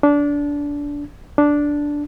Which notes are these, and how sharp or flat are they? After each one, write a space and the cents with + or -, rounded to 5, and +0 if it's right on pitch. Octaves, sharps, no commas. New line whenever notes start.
D4 -20
D4 -5